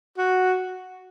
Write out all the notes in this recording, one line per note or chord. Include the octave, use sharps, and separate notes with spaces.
F#4